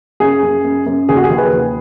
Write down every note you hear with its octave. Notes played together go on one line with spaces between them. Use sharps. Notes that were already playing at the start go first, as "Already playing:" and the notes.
F#2 G#4
F#2
F#2
F#2
D#2 G#4
F#4
G#4
D#2
B4
D#2